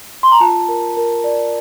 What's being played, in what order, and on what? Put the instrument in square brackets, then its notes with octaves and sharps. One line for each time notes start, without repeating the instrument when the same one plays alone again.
[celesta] C6
A#5
F4 A5
A#4
A#4
D5